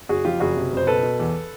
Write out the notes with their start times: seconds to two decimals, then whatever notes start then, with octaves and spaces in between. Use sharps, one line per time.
0.09 F#1 F#4 G#4
0.25 F2 F4 G4
0.40 F#1 F#4 G#4
0.57 C3
0.72 F#1 C5
0.87 B2 A4 B4
1.03 B2
1.19 E2